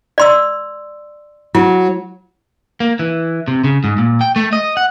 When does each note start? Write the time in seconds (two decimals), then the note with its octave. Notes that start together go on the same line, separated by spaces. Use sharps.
0.18 D5 C6 E6
1.55 F#3 E4
2.80 A#3
2.99 E3
3.48 C3
3.64 C#3
3.84 G#2
3.98 A#2
4.21 G5
4.36 A3
4.53 D#5
4.77 F#5